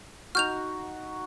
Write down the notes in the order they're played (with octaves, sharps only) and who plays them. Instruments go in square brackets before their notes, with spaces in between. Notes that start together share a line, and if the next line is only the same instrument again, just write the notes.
[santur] D#4 F#4 [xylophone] F6 G6 F7